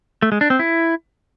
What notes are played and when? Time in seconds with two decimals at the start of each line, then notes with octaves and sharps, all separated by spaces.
0.22 A3
0.32 G#3
0.41 D4
0.50 C4
0.59 E4